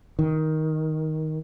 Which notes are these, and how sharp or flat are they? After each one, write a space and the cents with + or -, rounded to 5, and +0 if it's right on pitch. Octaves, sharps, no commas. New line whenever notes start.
D#3 +10